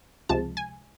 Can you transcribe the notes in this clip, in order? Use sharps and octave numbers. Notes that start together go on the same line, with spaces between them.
C#2 C3 F3 G#3 A5
G#5